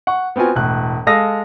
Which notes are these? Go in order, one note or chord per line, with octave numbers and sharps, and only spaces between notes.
F#5 C#6
B3 C4 F4 F#4 G#5
E1 A2 F#6
G#3 A4 F5 D#6 A#6